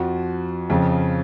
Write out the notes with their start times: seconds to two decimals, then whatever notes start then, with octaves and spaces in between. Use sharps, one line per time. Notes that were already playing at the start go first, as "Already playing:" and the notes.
Already playing: F2 F3 F#4
0.70 F2 C#3 F3